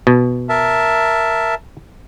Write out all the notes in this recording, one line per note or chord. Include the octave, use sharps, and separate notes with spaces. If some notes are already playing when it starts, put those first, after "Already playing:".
B2
A#4 E5 A5